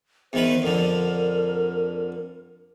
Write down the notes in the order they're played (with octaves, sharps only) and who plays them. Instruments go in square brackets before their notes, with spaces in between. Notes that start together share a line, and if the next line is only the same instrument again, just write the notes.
[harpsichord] E2 D#3 B4 [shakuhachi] C5
[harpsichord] F2 D3 [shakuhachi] A#4